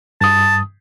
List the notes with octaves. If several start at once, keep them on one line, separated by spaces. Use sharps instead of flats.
G2 A5 D#6